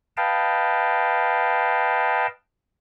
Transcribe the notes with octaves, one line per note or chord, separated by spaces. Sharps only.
B4 D#5 F5 G5 A5